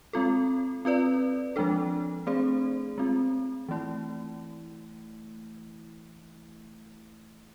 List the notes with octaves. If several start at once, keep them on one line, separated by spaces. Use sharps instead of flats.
G#3 C4 F4 A4
C4 F4 B4 D5
F3 G#3 D4 A4
A3 C4 G#4 C5
G#3 C4 F4
E3 A3 E4